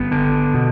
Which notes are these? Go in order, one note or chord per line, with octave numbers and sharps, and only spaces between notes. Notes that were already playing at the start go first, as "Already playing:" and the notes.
Already playing: G1 B3
D3
B2